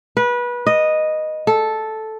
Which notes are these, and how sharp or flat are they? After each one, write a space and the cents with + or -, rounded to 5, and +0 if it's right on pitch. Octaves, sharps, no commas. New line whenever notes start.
B4 -25
D#5 -5
A4 -5